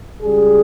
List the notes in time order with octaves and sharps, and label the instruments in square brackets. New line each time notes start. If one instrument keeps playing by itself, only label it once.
[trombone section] C#2 C#3 G3 G#4